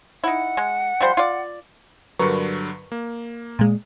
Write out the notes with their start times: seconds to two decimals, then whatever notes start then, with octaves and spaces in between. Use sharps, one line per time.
0.24 D#4 E4 F#5
0.57 G#3
1.01 F3 G3 C5
1.17 F4 D5
2.19 G2 D3 F#3 A#4 B4 C#6
2.92 A#3
3.59 A#2 G#3